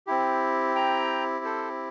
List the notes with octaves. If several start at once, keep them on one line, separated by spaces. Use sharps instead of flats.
C4 E4 G4
G5 A#5
A4 C5